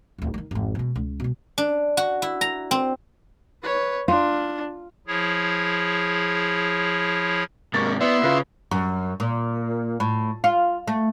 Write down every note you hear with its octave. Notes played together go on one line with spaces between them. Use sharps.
D1 G1
D#3 F#3
G#1 F2
B2 G#3
C#2
B2 G#3
D4
F#4
E4
A#5
C4
B4 C#5
D4 F4
F3 E4 G#4 C#5
G#2 C3 A#3 C#6 A6
B3 E4 D5 E5 C6
C#3 F4 B4
F#2
A#2
A2
F4
A3